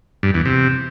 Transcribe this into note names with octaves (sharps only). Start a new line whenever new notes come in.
G2
E2
C3